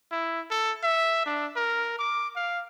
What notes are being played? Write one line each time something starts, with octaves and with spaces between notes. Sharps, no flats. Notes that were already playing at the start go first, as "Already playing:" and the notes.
E4
A4
E5
D4
A#4
D6
F5